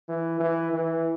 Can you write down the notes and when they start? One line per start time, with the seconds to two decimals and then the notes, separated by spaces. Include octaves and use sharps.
0.09 E3
0.40 E3
0.73 E3